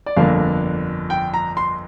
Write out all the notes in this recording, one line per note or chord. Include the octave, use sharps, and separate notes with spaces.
D5
G1 F2 D3 A#3 D4 F5
G5
A#5
C6